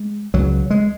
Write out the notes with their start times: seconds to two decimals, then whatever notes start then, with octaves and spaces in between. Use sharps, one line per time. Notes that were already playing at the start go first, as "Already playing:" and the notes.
Already playing: G#3
0.34 C#2 C#3 F#3
0.71 G#3